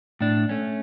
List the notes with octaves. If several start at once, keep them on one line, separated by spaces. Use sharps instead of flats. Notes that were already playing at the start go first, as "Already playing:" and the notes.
A2 D4
A3 C#4